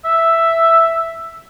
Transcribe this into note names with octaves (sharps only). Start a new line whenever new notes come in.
E5